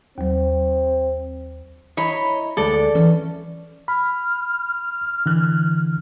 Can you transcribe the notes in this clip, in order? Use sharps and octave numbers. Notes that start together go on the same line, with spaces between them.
D#2 F#3 C4
E4 C#5 D#5 A#5 B5
D2 G#3 A4 D5 F#5
E3 C#4
B5 F6
D3 E3 F#6